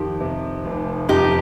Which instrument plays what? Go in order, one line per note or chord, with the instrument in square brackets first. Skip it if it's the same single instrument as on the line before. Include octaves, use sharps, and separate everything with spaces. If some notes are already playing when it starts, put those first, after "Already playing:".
Already playing: [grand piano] F2 D#3 [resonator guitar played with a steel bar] G4
[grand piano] C3
F1
[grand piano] F2 [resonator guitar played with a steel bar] D#4 G4